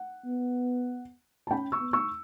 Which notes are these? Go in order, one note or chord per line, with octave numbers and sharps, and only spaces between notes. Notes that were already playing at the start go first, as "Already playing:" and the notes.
Already playing: F#5
B3
A5
C#4 G5 B5
C#6 E6
B3
C#6 E6